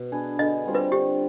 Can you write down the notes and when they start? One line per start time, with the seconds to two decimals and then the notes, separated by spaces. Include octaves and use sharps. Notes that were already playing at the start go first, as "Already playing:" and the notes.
Already playing: B2
0.12 B3 D4 G#4
0.39 D3 D#5
0.65 G3 C4 F4
0.75 B4
0.92 D3 G4